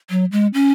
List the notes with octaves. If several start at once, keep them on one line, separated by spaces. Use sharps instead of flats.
F#3
G#3
C#4